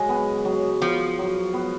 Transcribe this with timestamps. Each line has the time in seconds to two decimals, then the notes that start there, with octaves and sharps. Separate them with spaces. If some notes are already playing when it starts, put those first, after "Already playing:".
Already playing: C#3 F#3 G#3
0.09 B3
0.45 F#3
0.81 F3 B3
1.18 F#3
1.54 B3